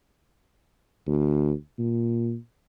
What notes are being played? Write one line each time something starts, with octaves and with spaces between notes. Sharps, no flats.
D2
A#2